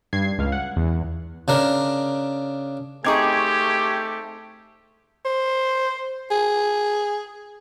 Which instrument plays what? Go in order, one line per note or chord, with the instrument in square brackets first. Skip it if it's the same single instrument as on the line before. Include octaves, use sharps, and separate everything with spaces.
[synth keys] G2 G#6 C7
C#2 F5
F#5
E2
[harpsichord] C#3 D4 A#4
[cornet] A3 [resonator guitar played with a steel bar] C4 D#4 G#4 [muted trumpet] G4 [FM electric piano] C#6 D6 G#6
[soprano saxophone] C5
G#4